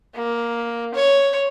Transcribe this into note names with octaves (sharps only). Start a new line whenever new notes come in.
A#3
C#5